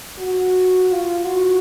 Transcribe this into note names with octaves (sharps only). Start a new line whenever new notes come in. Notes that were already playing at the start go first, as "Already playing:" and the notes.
F#4
F4
F#4